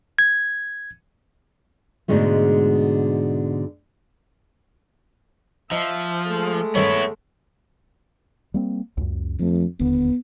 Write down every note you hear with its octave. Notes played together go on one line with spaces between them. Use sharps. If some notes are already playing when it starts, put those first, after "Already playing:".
G#6
G#2 B2 D3 G#3 A3
F3 D#4 E5
G#3 A3
G2 C3 D#3 B3 E4 C#5
G3 A#3 C4
C#2 F#2
F2 F3 A3
E1 D#2 D3 B3